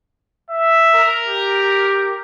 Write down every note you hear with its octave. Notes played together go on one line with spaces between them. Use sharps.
E5
A#4
G4